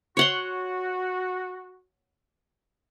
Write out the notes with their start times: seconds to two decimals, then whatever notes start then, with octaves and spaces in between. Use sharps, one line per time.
0.17 F#4 C#5 F#5 C6